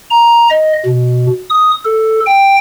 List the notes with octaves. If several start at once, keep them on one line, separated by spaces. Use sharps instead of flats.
A#5
D#5
B2
D#6
A4
G5